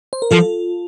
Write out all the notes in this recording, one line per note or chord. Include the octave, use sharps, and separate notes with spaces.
C5
A#4
F3 F4 A4